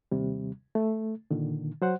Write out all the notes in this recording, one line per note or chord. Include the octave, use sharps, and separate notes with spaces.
D#2 C3 G3
A3
A#2 D3 D#3
F#3 C5 F#5